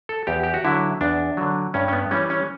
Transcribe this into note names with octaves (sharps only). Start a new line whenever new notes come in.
A4
E2 G4
G4
F#4
D3 F#3 E4
E2 D4
D3 F#3
G2 C#4
C#4
B3
E3 G3 C#4
C#4